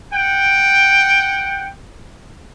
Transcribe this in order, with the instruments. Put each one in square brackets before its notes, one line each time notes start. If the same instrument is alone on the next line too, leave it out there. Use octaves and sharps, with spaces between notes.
[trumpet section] F#5 G5